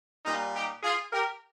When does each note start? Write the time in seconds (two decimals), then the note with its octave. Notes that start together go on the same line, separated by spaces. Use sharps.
0.25 A#2 G3 A#3 D#4
0.54 D#4 G4
0.83 F4 G#4
1.12 G4 A#4